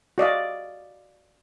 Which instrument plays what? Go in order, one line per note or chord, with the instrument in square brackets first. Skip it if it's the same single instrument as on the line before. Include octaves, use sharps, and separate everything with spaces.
[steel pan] F#4 D5 D#5 F5